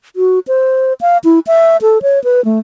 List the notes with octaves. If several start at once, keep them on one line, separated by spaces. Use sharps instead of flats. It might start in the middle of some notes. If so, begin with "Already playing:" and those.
F#4
C5
F5
E4
E5
A4
C#5
B4
A3